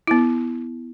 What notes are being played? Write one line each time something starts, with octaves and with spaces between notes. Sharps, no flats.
B3 E4